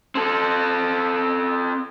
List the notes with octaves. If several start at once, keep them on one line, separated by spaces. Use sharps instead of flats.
C4 A4